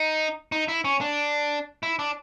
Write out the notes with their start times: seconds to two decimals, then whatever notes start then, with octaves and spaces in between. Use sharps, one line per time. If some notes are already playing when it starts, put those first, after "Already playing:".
Already playing: D#4
0.52 D#4
0.68 E4
0.85 C#4
1.01 D4
1.83 E4
1.99 D4